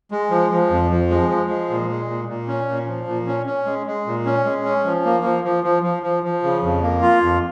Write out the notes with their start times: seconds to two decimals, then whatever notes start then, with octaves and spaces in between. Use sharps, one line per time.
0.11 G#3
0.30 F3
0.51 F3
0.70 F2
0.90 F3
1.10 G#3
1.29 F3
1.49 G#3
1.70 A#2
1.89 G#3
2.08 A#2
2.28 A#2
2.47 C#4
2.68 A#2
2.87 F3
3.07 A#2
3.27 C#4
3.46 C#4
3.66 G#3
3.86 G#3
4.06 A#2
4.26 C#4
4.45 G#3
4.64 C#4
4.85 F3
5.05 A#3
5.24 F3
5.44 F3
5.64 F3
5.83 F3
6.03 F3
6.23 F3
6.43 C#3
6.62 F2
6.82 A#3
7.02 F4
7.22 F2